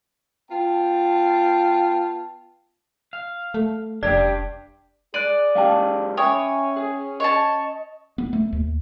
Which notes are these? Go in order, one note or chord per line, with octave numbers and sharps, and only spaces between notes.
B3 F4 G5 A5
F5
A3
F1 D4 G4 D5
G#4 D5 F#6 D7 D#7
G#3 C#4 G4 F5 G5 A5
C#4 C#5 E5 G5 G#5 D#6
G#4
C#5 D#5 A5
B3
A3
D#2